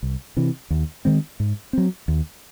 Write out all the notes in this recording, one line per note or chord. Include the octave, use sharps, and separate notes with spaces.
C2
C3 E3
D#2
D#3 G#3 C4
G#2
F#3 C4
D#2